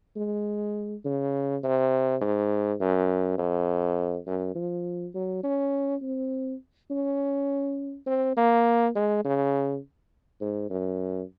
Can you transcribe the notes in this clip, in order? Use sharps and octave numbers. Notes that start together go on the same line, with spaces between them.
G#3
C#3
C3
G#2
F#2
F2
F#2
F3
F#3
C#4
C4
C#4
C4
A#3
G#3
C#3
G#2
F#2